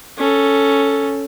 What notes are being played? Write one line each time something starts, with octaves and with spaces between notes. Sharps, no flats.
C#4 A4